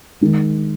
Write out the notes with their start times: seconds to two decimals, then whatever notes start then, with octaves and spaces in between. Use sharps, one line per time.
0.21 D#3 G#3